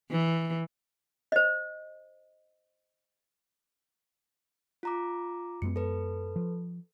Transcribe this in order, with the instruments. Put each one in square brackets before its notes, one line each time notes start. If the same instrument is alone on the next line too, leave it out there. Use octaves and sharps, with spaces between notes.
[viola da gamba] E3
[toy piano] C5 D#5
[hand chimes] F4 A#5 D6
[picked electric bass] F#2 G#3 B3 [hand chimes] C#7
[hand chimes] A4 B4
[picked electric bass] F3